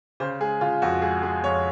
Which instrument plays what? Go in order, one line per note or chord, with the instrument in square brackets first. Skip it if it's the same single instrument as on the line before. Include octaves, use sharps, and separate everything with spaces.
[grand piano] C#3 C5
G#3 G#4
C#3 F4
F2 F#4
G#3 G#4
G#3 G#4
F2 C#5